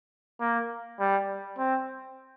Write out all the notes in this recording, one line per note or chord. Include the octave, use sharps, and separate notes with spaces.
A#3
G3
C4